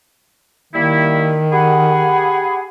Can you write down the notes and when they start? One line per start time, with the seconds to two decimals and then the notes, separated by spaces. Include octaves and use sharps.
0.73 D#3 G3 A#3 E4
1.52 G4 G#4 F#5 B5